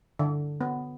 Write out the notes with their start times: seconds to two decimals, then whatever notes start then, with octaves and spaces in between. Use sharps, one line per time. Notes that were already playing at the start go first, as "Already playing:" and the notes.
0.19 D3
0.61 B3